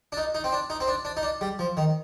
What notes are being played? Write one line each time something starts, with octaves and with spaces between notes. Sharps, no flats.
D4
D#4
D#4
C4
D4
D#4
C4
D4
D4
D#4
D4
G3
F3
D#3